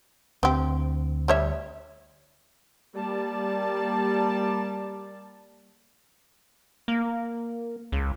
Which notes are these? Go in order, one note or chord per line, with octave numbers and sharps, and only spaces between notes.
D2 C4 G4
G3 C#5 E5
G3 A#3 D5 A5
A#3
C#2